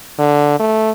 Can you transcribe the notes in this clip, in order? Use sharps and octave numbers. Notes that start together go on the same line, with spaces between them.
D3
A3